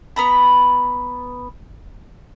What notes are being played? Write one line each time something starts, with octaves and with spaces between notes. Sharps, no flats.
B3 A#5 B5